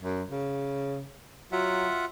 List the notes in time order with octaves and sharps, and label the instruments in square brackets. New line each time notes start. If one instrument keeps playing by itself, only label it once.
[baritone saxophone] F#2
C#3
[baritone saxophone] F#3 [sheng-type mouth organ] F4 E5 F#5